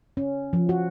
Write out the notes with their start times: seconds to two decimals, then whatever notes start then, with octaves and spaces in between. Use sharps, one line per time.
0.17 C#4
0.53 F3
0.69 F#4